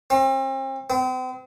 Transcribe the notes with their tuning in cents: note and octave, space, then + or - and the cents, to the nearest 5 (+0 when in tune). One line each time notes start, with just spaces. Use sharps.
C4 +40
C4 -40